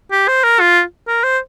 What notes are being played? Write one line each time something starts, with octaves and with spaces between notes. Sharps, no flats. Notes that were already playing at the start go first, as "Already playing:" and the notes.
G4
C5
A#4
F4
A#4
C5